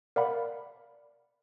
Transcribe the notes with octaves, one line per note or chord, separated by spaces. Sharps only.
A#4 D5 F5 F#5 B5